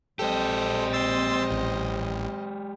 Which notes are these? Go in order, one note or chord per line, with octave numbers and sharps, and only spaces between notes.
A#1 G#3 C4 G4 A4 C5 D#5
C6 E6 A6
A1